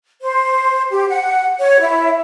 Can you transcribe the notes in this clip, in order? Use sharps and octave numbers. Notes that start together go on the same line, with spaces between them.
C5
G4
F#5
C#5
E4